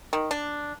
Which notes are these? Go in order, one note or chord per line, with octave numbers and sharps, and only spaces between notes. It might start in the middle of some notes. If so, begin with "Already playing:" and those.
D#3
D4